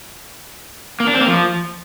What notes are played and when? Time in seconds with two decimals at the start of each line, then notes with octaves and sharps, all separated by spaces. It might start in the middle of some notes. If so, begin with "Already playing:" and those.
1.00 A#3
1.07 D4
1.14 C4
1.21 A#3
1.28 F3